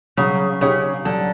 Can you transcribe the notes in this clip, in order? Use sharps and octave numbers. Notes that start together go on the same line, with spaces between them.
C#3 F#3
C#3 C#4 G4 C#5
D3 F#3